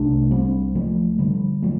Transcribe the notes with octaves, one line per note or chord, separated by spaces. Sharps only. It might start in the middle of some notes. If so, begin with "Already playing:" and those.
Already playing: C2 C3 A3 D4
G3 C4
F3 A3
D3 G3
F3 A3